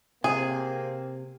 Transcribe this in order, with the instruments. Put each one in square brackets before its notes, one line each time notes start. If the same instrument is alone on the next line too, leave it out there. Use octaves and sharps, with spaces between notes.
[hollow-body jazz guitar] C3 [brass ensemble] A#3 C4 [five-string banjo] G#4